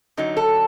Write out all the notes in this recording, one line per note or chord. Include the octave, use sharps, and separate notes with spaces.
F#2 D3 F#3 D#4
A4